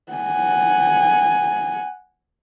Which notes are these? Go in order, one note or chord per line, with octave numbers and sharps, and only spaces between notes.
F#5 G#5